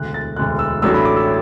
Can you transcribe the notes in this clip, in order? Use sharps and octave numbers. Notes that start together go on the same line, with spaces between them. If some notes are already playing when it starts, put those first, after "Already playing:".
Already playing: E1 D2 D3 F#6
A6
E1 D2 D3 F#6
E6
A1 A2 F#3 A3 D4 E6
B5
D6
E6